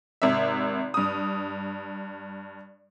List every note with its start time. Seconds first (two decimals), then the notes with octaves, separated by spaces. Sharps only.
0.22 G#1 C3 E5
0.94 G2 D#6